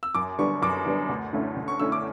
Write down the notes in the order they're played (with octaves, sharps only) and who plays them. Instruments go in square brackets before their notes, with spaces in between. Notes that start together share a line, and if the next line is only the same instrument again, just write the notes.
[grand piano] E6
[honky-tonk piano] F#2 [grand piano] D6
[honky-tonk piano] D3 G3 B3 D4 [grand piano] C#6
[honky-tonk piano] F#2 [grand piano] D6
[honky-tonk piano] D3 G3 B3 D4
D2
D3 A3 C#4 E4
D2
[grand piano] C#6
[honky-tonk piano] D3 A3 C#4 E4 [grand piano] E6
[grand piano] D6